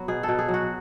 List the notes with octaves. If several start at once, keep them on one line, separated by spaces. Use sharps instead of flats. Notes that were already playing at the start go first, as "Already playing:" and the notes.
Already playing: F#3 B3
B2 G#4
A4
B2
G#4
F#3
F#4